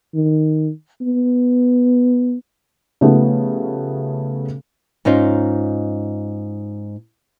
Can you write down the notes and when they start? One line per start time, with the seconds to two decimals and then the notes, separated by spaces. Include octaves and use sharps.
0.14 D#3
1.01 B3
3.01 C#3 F3 A3 B3 G4
5.05 G#2 C#4 D#4 F4